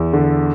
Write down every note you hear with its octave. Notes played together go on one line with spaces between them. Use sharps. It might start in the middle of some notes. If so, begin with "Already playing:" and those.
Already playing: E2
D3